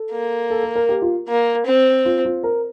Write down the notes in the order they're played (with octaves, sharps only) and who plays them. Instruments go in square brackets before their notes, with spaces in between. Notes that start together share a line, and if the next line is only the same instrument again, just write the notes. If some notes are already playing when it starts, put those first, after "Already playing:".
Already playing: [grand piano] A4
[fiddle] A#3
[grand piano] A4
A#4
A#4
G4
F4
[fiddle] A#3
C4
[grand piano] F4
F4
A#4